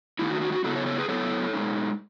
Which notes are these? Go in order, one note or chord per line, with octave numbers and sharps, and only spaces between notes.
D#3 A3 D#4 E4
F#4
F#4
F#4
C#3 F#3 B3 E4 F#4 A4
A4 C#5
A4 C#5
G#4 B4
F#3 B3 E4 A4 C#5
B2 G#3 B3 D#4